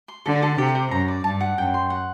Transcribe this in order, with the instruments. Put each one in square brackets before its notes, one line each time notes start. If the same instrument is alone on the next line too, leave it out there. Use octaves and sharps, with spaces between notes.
[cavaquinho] C6
[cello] D3 [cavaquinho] A4
[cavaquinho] A4
[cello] C3 [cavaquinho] G4
[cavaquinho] C5
[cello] F#2 [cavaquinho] A#5
[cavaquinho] D5
[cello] G2 [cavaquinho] A5
[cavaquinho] F#5
[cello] F#2 [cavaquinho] G5
[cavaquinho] C6
F#5